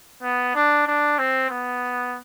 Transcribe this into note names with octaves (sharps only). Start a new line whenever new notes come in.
B3
D4
D4
C4
B3